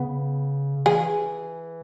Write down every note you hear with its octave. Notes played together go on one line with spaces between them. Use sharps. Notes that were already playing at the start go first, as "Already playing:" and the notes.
Already playing: C#3 B3
E3 G#4